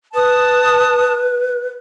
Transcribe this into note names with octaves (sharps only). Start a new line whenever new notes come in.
B4 A5 D#6